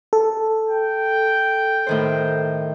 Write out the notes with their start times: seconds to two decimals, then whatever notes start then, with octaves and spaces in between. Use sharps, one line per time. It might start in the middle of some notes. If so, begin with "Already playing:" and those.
0.13 A4
0.69 G5
1.87 A2 D#3 C5